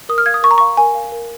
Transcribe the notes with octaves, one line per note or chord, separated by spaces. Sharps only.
A#4 D#6
F6
F5 G#6
D#6
A#4 C#6
A#5
F5 C#6
A#4 G#5
F5
A#4